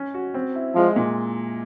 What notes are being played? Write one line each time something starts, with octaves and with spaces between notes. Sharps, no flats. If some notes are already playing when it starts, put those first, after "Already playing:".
Already playing: C#4
F#4
C4
E4
F3 G#3
A#2